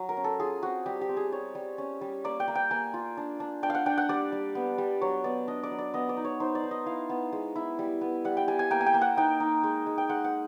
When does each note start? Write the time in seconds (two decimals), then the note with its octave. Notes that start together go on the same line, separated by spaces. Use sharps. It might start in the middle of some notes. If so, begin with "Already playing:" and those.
Already playing: F#3
0.09 A#4
0.17 C#4
0.24 A4
0.40 F4 G#4
0.63 C4 F#4
0.86 G3 G4
1.01 G4
1.09 C4
1.17 G#4
1.32 G3 C#5
1.55 G3
1.78 C#4
2.01 G3
2.24 A#3 D5
2.40 G5
2.48 A#3
2.55 G5
2.71 A#3 G#5
2.94 F4
3.17 D4
3.40 D4
3.63 D4 G5
3.70 F5 F#5
3.86 D4 G5
3.98 F#5
4.09 G3 D5
4.32 G3
4.55 B3
4.78 G3
5.01 F#3 C#5
5.24 B3 D5
5.48 D4 D#5
5.63 D5
5.71 F#3
5.79 D5
5.94 B3 D#5
6.09 D5
6.17 D#4
6.25 C#5
6.40 D#4 C5
6.55 D5
6.64 D#4
6.71 D#5
6.86 E4 F5
7.09 B3
7.32 G#3
7.56 E4
7.79 G3
8.01 B3
8.25 G3 F#5
8.37 G5
8.48 G3 G#5
8.59 G#5
8.71 A#3 G5
8.81 G#5
8.86 G5
8.94 A#3
9.01 F#5
9.17 D#4 G5
9.40 D#4
9.63 G#3
9.86 G#3
9.98 G5
10.09 G#3 F#5
10.25 F#5